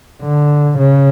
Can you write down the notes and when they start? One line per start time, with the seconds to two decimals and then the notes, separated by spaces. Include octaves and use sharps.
0.22 D3
0.79 C#3